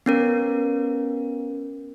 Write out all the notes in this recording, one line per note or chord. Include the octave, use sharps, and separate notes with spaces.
B3 C#4 A#4